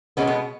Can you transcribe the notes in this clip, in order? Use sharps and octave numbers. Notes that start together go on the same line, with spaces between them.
B2 G#3 B3 C#4
B3